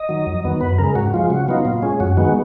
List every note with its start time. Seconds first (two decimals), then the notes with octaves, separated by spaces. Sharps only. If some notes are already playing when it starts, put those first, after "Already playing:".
Already playing: D#5
0.09 D#3 F#3
0.27 F2
0.45 D#3 F#3 B3
0.61 F#2 B4
0.78 C#3 G#3 A#4
0.95 G#2 F#4
1.14 F3 G#3 F4
1.30 C#3 F#4
1.48 F#3 B3 D#4 F4
1.65 A#2
1.82 G#3 C#4
2.00 F#2 F#4
2.17 D#3 G#3 B3 F#4